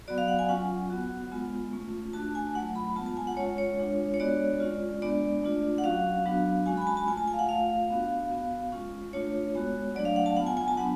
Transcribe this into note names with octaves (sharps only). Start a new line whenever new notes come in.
F#3 B3 F#4 D5
F5
F#5
G#5
F#3 C#4 F4 F#5
B3 F#4
G#3 B3 F4
A3 C#4 F4
A3 D4 F#4 A5
G#5
F#3 A3 F4 F#5
B5
G#3 B3 F4 A5
A5
G#5
F#5
G#3 C#4 F4 C#5
C#5
G#3 D4 F4
C#5
G#3 B3 D4 F#4 D5
G#3 C#4 F4
G#3 B3 D4 D5
A3 D4 F4
F#5
F#3 C#4 F#4 F5
F#3 B3 D4 F#4
G#3 C#4 F#4 G#5
B5
G#5
A5
A5
A3 F4 G#5
A5
G#5
F5
F#5
A3 F4 F5
B3 D4 F#4
B3 F#4
G#3 C#4 F4
A3 D4 F4 C#5
G#3 B3 F#4
F#3 A3 D4 D5
F5
F#5
A5
B3 F4 F#5
G#5
G#5
A5
F#3 B3 D4 F#5